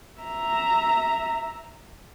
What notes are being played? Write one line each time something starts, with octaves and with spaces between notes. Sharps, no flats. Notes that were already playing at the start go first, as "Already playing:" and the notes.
E5 A#5